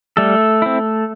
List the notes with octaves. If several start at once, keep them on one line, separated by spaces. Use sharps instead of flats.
G3 A3 A4
C4 E4